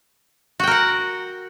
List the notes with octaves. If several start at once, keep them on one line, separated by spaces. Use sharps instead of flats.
F#4 A#4 F#5 G5